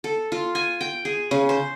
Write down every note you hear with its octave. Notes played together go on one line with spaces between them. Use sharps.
A4
F4
G#5
G5
G#4
C#3
C5